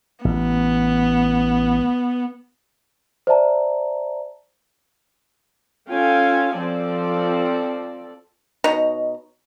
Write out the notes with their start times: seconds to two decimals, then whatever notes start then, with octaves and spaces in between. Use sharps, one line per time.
0.25 A1 B3
3.27 C5 D5 E5 A5 A#5
5.89 C#4 F4 A4 F5 G5 G#5
6.58 F3 C4 A4 D5
8.64 B2 D#4 C#5 A#5